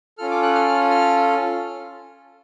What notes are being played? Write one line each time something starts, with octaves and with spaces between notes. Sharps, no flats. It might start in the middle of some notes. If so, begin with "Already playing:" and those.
C#4 F4 A4 F6
D6
F#6
F6
F6